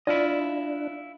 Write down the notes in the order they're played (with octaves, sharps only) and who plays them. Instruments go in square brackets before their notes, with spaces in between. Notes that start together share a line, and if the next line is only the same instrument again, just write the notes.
[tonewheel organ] D4 [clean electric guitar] E4 F4 D#5 [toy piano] D5